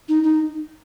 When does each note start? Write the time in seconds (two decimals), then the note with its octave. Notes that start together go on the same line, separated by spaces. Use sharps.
0.09 D#4
0.23 D#4